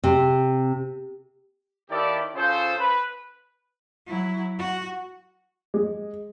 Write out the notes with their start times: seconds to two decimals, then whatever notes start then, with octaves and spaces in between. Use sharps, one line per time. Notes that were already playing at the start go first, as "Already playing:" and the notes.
0.04 C3
1.90 D#2 D#3 E4 G4 A4 D5
2.35 C#3 C#4 F4 A4 C5
2.79 B4
4.06 F#3 E4
4.58 F#4
5.74 G#3